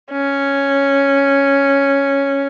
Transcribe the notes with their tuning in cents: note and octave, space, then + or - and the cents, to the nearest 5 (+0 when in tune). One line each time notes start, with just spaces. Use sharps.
C#4 +0